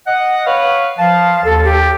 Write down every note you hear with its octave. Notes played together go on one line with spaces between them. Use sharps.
D#5 F#5
B4 C#5 F5
F3 F5 A5
D#2 A4
G4